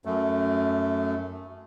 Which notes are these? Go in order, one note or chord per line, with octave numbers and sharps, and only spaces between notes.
F#2 A3